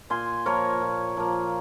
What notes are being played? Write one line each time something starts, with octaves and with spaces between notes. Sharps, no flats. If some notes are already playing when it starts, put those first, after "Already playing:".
A#2 G#5 C6
F3 A#3 A#4 C#5
A#2
F3 A#3